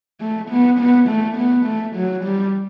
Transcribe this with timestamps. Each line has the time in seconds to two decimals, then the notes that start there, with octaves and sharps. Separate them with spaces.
0.21 A3
0.49 B3
0.79 B3
1.08 A3
1.36 B3
1.65 A3
1.95 F#3
2.24 G3